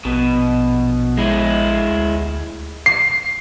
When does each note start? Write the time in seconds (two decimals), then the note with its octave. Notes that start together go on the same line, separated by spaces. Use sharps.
0.05 A#1 B2
1.18 G#3 E4
1.90 D2
2.86 C7